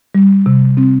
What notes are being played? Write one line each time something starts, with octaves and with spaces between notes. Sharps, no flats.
G3
C3
C4